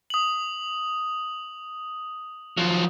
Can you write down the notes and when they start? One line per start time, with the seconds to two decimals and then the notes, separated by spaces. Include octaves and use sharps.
0.10 D#6 F#7
2.57 F3 F#3